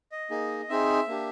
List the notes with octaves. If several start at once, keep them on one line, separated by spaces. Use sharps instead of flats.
D#5
A#3 D#4 G#4
C4 D#4 G#4 E5
A#3 D4 G4